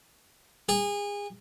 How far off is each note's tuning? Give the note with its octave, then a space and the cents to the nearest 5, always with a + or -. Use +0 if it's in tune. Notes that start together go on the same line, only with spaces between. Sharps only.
G#4 -30